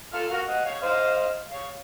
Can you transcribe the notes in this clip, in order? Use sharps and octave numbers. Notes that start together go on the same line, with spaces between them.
F4 A4 F5
F#4 A#4
D#5 F#5
C#5 F5
C5 D#5 F5
C#5 F5